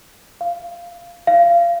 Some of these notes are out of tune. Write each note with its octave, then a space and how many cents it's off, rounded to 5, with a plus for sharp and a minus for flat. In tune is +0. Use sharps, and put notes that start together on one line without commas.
F5 -10
F5 -25